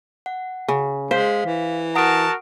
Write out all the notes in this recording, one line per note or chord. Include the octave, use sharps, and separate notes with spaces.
F#5
C#3
G#3 C5 F5 B6
E3
F#4 A#4 F#5 A5 D#6 D7